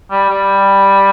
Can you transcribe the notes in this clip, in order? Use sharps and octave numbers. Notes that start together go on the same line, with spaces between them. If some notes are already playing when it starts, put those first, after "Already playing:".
G3
G3